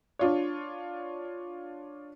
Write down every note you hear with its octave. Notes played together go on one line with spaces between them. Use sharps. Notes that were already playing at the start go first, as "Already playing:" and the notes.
D4 F4 C#5